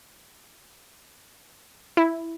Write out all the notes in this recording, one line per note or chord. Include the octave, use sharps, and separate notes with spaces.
E4